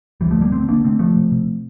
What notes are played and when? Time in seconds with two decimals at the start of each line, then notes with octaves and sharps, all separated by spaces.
0.21 D2 E3 G3
0.31 F3 A3
0.37 D3 G3 A#3
0.52 D3 A3 C4
0.68 D3 A#3 D4
0.84 C3 A3 C4
0.99 C3 F3 A3
1.16 C3
1.32 C3